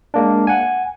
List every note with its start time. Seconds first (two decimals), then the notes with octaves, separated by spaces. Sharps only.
0.14 G#3 A#3 D4
0.47 F#5 G#5